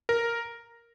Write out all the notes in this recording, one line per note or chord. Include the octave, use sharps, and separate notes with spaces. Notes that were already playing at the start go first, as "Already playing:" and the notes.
A#4